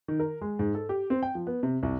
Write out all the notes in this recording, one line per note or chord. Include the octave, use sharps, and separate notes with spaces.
D#3
A#4
G#3
G#2
A4
G4
C4
G5
F3
B3
C3
C2